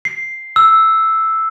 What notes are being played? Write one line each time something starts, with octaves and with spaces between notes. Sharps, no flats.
C7
E6